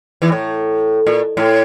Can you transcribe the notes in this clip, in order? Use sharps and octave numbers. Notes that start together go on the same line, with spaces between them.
E2 E3
A2
A#2
A2